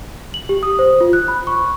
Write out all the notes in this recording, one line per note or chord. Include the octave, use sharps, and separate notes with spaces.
F#7
G4
D#6
C5
F4
F#6
B5
C#6